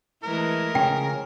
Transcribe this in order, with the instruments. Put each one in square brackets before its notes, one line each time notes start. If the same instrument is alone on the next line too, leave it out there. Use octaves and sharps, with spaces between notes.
[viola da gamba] E3 G#3 A3 [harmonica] A#4
[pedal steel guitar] C#3 C#4 [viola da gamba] F3 [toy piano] G5